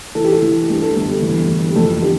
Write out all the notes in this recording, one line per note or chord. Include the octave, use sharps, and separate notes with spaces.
E3 A4
G4
A4
E3
G2 G4
A4
G1 A4
G4
E2
E2
G4
F2 A4
D3 G4